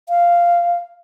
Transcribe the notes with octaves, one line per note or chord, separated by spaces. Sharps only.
F5